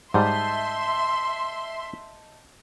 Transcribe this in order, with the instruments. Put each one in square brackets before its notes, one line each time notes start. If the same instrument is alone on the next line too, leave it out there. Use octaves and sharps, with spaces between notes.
[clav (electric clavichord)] G#2 G3 [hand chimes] D#5 A5 G6 [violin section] E5 C6